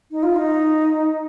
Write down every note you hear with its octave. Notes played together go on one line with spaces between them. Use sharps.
D#4
F4
D#4